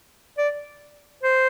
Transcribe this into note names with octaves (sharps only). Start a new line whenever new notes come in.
D5
C5